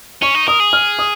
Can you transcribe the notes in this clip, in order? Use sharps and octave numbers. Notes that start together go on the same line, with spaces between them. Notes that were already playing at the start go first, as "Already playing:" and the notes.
C#4 C#6
D#4
A#4 D#6
G#4
F6
D#6